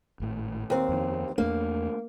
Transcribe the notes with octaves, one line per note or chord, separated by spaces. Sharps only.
G#1 A2
D#2 C4
F2 D#3
E2 A3 A#3 D4